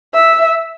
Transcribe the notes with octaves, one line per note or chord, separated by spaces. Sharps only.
E5